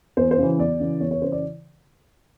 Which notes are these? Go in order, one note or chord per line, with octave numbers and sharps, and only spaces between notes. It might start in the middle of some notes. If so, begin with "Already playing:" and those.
E2 C5
C5
C#3 E3
E2 D5
C#3 E3
E2 C#5
C#5
C#3 E3 C5
D5